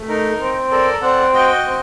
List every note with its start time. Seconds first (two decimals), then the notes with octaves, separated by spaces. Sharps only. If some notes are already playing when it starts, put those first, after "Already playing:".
Already playing: A3
0.08 D#4 A#4
0.39 C4
0.71 A4 A#4 D5
1.02 C4 D5 F#5
1.33 F#4 D#5 G5
1.65 C4